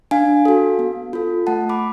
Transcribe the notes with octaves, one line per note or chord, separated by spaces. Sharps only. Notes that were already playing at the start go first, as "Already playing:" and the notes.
D4 F5 G#5
F#4 A4
B3
F4 A4
A3 F#5 A5
B5 D6